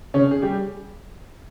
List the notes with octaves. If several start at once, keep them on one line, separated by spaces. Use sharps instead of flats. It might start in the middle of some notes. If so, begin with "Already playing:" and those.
C#3 C#4
G#4
G3 G4